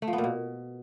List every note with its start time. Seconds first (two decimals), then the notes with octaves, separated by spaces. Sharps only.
0.02 A3
0.07 F3
0.13 B3
0.18 A#2
0.24 B2